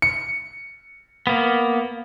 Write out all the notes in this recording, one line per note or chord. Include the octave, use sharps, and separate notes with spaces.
C#7
A#3 B3